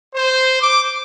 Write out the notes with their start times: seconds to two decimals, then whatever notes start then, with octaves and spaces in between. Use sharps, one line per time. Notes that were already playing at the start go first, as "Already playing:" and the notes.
0.14 C5
0.60 D6